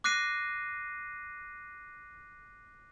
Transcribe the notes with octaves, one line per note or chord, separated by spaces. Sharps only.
D6 F#6 A#6 C7 D#7